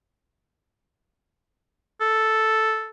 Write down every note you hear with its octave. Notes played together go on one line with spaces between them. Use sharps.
A4